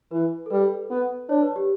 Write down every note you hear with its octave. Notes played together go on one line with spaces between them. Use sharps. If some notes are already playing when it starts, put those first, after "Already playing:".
E3 B4
A4
G3 B4
B3
D4 C#5
B4
G4